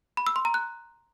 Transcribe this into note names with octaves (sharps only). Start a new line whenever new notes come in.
B5
E6
C6
A#5
F#6